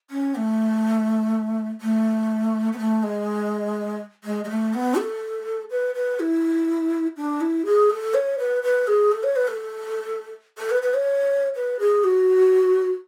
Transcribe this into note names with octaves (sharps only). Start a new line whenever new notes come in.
C#4
A3
A3
B3
A3
G#3
G#3
G#3
A3
B3
A4
B4
B4
E4
D4
E4
G#4
A4
C#5
B4
B4
G#4
A4
C#5
B4
A4
A4
B4
B4
C#5
B4
G#4
F#4